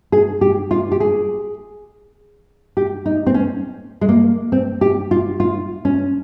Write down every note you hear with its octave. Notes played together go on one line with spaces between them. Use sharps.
G#4
G4
F4
G4
G#4
G4
D#4
C4
C#4
G#3
A#3
C4
G4
F4
F4
C#4